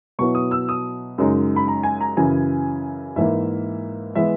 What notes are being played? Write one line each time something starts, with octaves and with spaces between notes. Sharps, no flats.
B2 F#3 B3 E4 C#6
D#6
E6
D#6
F#2 C#3 G#3 D#4
B5
A#5
G#5
A#5
F#2 C#3 E3 G#5
G#2 E3 A#3 E5
E3 G#3 B3 E5